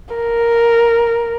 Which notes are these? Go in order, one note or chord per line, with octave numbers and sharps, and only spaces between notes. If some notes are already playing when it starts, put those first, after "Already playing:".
A#4